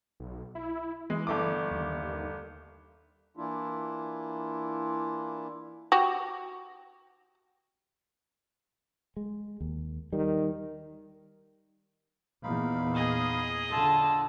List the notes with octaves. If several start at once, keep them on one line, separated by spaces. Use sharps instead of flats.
B1
E4
E3 G#3
G1 A3 D6
D#2
E3 A#3 D4 E4 F4
F#4 G4
G#3
D#2
D#3 G3
E2 A#2 D#4 F5 B5
G#4 D#5
D3 F4 A4 A5